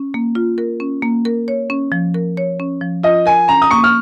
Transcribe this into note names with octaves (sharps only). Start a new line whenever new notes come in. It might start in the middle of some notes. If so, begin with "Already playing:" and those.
Already playing: C#4
A#3
F4
A#4
C#4
A#3
A#4
C#5
C#4
F3
A#4
C#5
C#4
F3
F4 D#5
A#4 G#5
C#4 A#5
D#6
A#3 C#6
F6